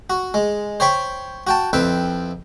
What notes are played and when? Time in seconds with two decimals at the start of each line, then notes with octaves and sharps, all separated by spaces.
0.10 F#4
0.34 G#3
0.80 C5 C#5 G5 B5 C#6
1.47 F#4 G5 A5
1.73 F2 C4 E4 B4 G5